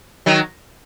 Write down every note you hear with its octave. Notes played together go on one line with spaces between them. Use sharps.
D#3 F#3